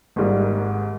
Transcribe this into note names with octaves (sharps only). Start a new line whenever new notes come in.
G#1 G#2 G3 A#3